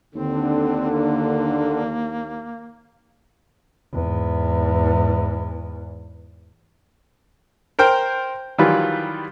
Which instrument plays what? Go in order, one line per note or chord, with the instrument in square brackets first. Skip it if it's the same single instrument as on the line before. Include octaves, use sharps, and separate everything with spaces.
[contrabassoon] D#2 [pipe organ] D3 [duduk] C4
[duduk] A#3
[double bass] E2 G#2
[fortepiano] A#4 C5 G5 F6
D#3 E3 F#3 G3 F4 B4